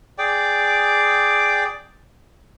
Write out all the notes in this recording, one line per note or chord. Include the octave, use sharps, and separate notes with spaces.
G#4 D5 G5 D6